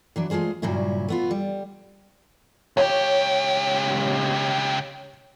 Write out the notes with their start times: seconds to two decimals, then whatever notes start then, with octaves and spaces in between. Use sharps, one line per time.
0.16 E3 F#3 D4
0.30 G#3 A3 F4 G#4 C5
0.62 G2 A#2 C#3 F#3 C#4 E4
1.08 A3 B3 F4
1.31 G3
2.77 C#2 G4 C#5